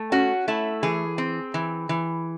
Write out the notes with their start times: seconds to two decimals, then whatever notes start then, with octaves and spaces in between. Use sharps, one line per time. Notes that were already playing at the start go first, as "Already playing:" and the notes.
Already playing: A3
0.12 C#4 F#4
0.48 A3 E4
0.83 E3 G#4
1.18 C4
1.54 E3
1.89 E3